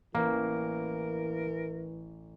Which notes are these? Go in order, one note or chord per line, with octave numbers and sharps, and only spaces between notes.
A1 E3 A#3 A#4